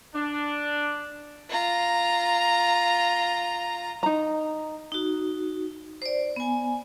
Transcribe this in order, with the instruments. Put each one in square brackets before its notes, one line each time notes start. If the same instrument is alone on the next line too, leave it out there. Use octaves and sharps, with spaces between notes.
[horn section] D4
[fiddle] F4 A#5
[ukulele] D#4 A#5
[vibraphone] D#4 F#4
C5 D5
B3 G#5